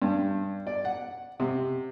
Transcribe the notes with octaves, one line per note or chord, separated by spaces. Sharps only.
G2
D5
F#5
C3